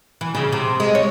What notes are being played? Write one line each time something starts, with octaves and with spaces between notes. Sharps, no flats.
E3
C#3
C3
G#3
C#5